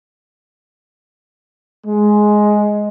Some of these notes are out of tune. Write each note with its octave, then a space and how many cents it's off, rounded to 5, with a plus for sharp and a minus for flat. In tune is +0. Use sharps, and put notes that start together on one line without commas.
G#3 +10